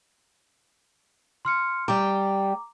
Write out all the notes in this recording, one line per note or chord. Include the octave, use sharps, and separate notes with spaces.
C6 F6 C#7
G3 G5 A#5 D6